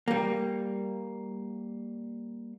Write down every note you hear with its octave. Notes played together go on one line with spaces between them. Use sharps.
G3 A#3